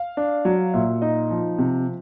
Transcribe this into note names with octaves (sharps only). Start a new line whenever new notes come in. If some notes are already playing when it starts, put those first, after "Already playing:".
Already playing: F5
D4
F#3
A#2 E5
D#4 D#5
F3
C3